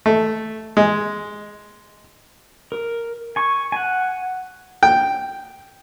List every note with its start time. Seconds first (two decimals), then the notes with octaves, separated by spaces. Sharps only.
0.06 A3
0.77 G#3
2.72 A#4
3.36 G#5 C#6
3.72 F#5 G#5
4.83 G5